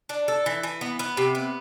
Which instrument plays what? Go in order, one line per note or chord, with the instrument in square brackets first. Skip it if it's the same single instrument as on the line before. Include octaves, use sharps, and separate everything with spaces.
[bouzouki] D4
A4
E3
E3
B3
B3
C3
B3